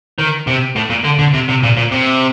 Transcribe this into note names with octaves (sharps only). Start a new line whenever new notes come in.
D#3
C3
A2
A#2
D3
D3
C3
C3
A#2
A#2
C3